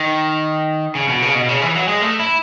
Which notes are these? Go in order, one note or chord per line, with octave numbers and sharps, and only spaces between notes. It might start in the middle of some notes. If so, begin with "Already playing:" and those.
Already playing: D#3
C#3
B2
C#3
B2
C#3
E3
F#3
G#3
A3
E4